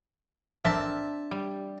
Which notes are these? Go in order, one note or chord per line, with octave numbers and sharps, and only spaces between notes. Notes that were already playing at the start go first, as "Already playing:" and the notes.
C4 D4 A#4 E5 A5
G3